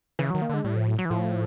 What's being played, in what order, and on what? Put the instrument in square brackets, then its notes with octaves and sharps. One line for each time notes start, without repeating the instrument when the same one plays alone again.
[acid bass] C#3 [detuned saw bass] E3
[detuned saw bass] D#3 [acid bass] F#3
[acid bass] A#3
[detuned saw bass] D3 [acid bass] G#3
[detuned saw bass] A2 [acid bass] G3
[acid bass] F3
F#3
F#3
E3
[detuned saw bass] A2 [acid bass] F3